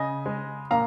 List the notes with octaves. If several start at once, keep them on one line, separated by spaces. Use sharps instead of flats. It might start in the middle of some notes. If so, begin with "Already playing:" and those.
Already playing: C#3 D#5 G#5
G#3
A#2 F5 A#5